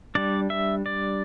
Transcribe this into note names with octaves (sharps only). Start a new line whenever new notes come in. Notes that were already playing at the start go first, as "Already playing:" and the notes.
G3 D4 D5
E5
D5